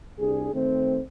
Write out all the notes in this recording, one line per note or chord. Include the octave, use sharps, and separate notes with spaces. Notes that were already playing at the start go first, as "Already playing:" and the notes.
C2 D4 G#4
D#3 A3 C4